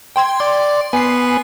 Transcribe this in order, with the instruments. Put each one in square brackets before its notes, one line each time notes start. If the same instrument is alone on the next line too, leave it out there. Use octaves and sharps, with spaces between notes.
[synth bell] G5 C6 G#6
[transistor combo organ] D5 [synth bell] C6
[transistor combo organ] B3 [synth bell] G#5 C7